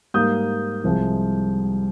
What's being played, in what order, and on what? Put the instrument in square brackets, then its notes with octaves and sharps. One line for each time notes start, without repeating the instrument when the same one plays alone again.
[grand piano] G#2 G3 A#3 D#6 G6
C2 C3 F3 G#3